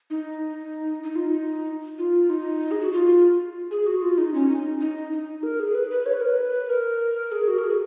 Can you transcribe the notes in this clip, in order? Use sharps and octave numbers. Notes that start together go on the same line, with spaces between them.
D#4
D#4
F4
D#4
F4
D#4
G#4
F#4
F4
G#4
F#4
F4
D#4
C#4
D#4
D#4
D#4
A#4
G#4
B4
B4
C#5
B4
A#4
B4
A#4
G#4
F#4
A#4
G#4